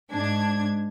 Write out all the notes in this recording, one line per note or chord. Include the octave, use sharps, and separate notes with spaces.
G#2 D4 G#6